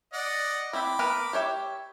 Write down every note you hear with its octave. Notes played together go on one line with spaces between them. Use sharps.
D5 D#5 F#5
C4 E4 B5 D6
B3 A#4 B4
G4 C#5 E5